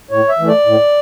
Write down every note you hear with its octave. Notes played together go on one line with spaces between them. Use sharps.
A2 C#5
E5
E3 A3
D5
A2